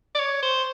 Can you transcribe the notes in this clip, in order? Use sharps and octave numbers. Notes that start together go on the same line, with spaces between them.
D5
C#5
C5